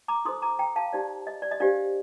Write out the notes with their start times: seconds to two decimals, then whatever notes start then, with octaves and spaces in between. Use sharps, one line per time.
0.08 A#5 D6
0.25 D#4 A4 C5 C6 D#6
0.42 A#5 D6
0.59 G5 A#5
0.76 F5 A5
0.93 D#4 G4 C5 D5
1.27 D#5
1.42 D5
1.51 D#5
1.60 D4 G4 C5 D5 F5